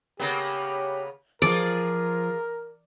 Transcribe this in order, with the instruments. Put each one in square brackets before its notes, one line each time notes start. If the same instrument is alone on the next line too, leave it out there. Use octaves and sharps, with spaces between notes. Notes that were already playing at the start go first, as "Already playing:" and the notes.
[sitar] C#3 A#3 B3 [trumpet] G4
[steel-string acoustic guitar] F3 [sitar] F4 G#4 [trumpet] A#4 [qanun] D5